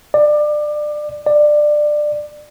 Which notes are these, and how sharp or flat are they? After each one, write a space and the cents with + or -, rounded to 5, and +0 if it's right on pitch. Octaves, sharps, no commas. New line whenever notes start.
D5 +25
D5 +20